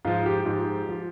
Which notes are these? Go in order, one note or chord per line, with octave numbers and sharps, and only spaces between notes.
G#2 F3 F4
G4
G#2 F3
F3